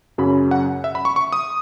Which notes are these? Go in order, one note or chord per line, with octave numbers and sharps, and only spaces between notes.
F#2 C#3 F#3 C#4 B5
F#5
E5
B5
C#6
C#6
D#6